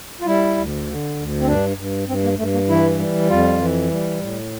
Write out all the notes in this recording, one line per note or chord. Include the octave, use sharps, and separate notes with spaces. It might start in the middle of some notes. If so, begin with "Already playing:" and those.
F4
G3 E4
D2
D3
D2
C4
G2 D4
G2
G2 C4
A#3
G2 A3
A#3
E3 E4
G3
F2 F4
E3
G3
A2